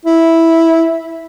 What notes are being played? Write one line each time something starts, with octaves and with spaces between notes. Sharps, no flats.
E4